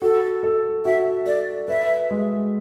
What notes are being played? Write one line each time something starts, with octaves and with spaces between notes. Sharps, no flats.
F#4 A4
A4
F#4 E5
A4 D5
B4 E5
G#3